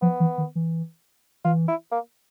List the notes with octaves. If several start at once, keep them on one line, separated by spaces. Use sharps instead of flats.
F3 B3
E3
D#3
E3
E3 F4
E4
A#3